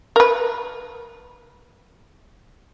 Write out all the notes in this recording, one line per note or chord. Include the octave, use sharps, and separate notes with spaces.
A#4 B4